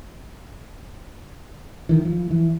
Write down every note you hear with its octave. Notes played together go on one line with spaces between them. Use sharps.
D#3 E3
F3
E3